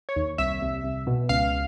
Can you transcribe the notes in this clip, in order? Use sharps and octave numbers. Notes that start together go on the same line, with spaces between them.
C#5
D#2
C2 E5
C2
C2
B2
C#2 F5